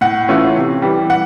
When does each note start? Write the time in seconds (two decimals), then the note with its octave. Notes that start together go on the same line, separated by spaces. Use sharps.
0.01 A2 F#5
0.28 E3 A3 C#4 F4
0.56 C3
0.82 E3 G3
1.10 F#5